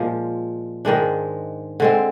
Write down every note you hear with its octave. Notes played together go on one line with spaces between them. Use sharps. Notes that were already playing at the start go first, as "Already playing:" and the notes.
Already playing: A#2 F3 G#3
G#2 D#3 G#3 D4
D3 G#3 C4